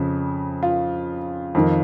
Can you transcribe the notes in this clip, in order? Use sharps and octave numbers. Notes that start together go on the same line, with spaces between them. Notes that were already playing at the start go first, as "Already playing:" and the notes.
Already playing: F2 C#3
F4
F2 D#3